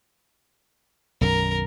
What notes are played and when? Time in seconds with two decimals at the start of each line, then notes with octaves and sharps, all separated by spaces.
1.21 B1 F#2 D#3 A#4